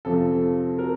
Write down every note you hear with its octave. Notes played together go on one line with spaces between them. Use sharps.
F2 C3 F3 A4
A#4